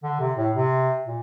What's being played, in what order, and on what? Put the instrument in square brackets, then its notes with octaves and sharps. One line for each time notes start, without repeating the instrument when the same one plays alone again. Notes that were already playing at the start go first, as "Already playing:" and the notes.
[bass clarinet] D3
C3
A2
C3
A#2